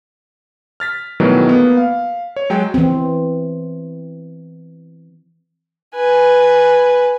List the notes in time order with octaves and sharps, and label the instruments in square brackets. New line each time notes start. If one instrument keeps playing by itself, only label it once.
[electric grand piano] F6 A6 B6
B2 D#3 E3 F#3 G3 A3
A#3 B3
F5
C#5
F#3 G#3 G5
[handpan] E3 C4
[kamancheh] B4 G#5